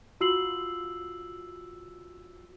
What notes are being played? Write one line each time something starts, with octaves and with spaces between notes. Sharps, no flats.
F4 F#4 E6 C7 F#7